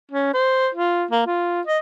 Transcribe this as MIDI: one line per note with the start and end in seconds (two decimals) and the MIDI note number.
0.12 0.30 61
0.34 0.69 72
0.75 1.05 65
1.11 1.22 58
1.27 1.62 65
1.67 1.79 75